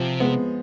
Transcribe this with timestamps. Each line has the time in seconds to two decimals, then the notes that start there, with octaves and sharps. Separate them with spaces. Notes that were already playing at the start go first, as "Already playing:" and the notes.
Already playing: C3 F3
0.20 G#3 B3